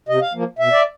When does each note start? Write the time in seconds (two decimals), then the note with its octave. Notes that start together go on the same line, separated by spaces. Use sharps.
0.08 C3 D#5
0.21 F5
0.34 F3 A#3
0.59 B2 E5
0.72 D5